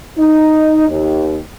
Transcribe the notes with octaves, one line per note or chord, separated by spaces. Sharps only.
D#4
D#2